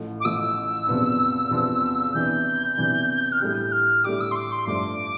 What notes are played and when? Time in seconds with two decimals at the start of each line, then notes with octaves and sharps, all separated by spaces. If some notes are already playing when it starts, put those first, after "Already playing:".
Already playing: A1 A2 F3
0.20 D6
0.25 A1 A2 F3 E6
0.87 E2 C3 F3 B3 D4
1.51 E2 C3 F3 B3 D4
2.14 C3 E3 B3 D4 G6
2.77 C3 E3 B3 D4
3.32 F6
3.40 A2 G3 D4 G4 G6
3.72 F6
4.04 A2 G3 D4 G4 D6
4.20 E6
4.31 C6
4.35 D6
4.51 C6
4.67 G2 F3 A3 D4 D6